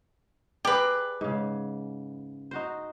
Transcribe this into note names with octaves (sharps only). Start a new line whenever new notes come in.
G4 G#4 A#4 B4 D5
G#2 C#3
D#4 F#4 C5